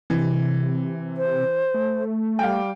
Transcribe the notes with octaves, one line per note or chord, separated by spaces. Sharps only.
C3 E3
C5
A3
G3 F5 G5